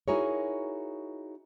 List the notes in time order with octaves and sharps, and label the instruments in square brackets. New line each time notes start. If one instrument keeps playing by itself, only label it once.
[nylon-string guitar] D#4 E4 F#4 G#4 A#4 C#5